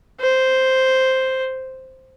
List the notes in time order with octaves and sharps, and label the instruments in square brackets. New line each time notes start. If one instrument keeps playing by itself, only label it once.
[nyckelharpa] C5